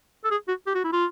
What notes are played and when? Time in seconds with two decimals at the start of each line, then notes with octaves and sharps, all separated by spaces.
0.24 A4
0.31 G#4
0.48 F#4
0.67 G4
0.75 F#4
0.84 E4
0.92 F4